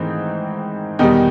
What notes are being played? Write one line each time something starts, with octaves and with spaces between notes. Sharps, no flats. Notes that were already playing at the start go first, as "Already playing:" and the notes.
Already playing: G#2 D#3 E3 A3 C4 D#4
E2 B2 D#3 G3 D#4